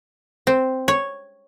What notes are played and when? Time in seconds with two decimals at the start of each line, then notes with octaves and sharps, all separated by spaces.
0.47 C4
0.88 C#5